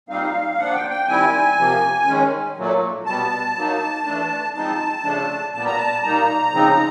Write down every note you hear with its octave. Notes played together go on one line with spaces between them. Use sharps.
A#2 G3 C4 D#4 F5
F3 A#3 D4 F#5
G5
G5
D#3 G3 C4 E4 G#5
C3 F3 A#3
D#3 G#3 C#4
A#2 F#3 A3
B2 G3 B3 A5
F#3 A#3 D#4
E3 A3 D4
F3 G#3 C4 D#4 A5
C#3 F3 A3 D4
A#2 G3 B3 A5
A#5
A5
A#2 G3 A#3 D#4 A#5
C#3 F3 G#3 C4 D#4